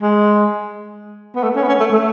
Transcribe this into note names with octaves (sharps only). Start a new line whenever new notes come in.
G#3
B3
A3
C#4
B3
C#4
A3
A3